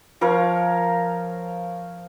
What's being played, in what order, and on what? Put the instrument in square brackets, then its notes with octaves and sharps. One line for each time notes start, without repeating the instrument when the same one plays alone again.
[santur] F3 A#4 C#5 F5